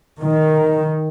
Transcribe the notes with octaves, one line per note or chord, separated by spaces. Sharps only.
D#3